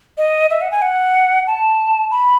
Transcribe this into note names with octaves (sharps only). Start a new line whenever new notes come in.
D#5
E5
F#5
G#5
F#5
A5
B5